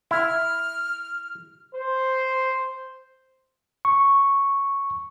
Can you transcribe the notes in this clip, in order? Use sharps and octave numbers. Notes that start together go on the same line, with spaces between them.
E4 F6
C5
C#6